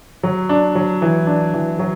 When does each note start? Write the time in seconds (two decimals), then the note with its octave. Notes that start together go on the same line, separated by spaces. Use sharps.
0.23 F#3
0.49 D4
0.75 F#3
1.02 E3
1.27 D4
1.54 E3
1.79 F#3